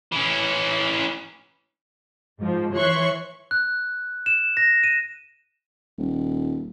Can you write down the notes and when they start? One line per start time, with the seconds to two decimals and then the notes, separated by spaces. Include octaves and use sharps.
0.12 E3 C#4
2.40 G#2 F3
2.74 E3 C#5 E5 C6 C#6 F#6
3.51 F#6
4.26 E7
4.57 A#6
4.84 D#7
5.98 D#1